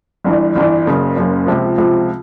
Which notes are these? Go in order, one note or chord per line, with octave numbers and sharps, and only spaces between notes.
G1 G2 E3
G1 G2 E3
F#1 F#2 C#3
F#1 F#2 C#3
C#2 C3 F3
C#2 C3 F3